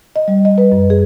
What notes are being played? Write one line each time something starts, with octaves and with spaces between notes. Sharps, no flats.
D#5
G3
D#5
B4
F#2
G#4